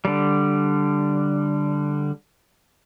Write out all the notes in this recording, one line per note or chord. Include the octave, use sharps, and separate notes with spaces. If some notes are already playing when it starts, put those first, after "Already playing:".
D3 G3